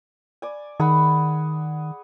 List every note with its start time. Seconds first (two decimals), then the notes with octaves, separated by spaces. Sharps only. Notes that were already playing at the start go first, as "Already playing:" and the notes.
0.42 D5 G#5
0.80 D#3 G#4 F#5 B5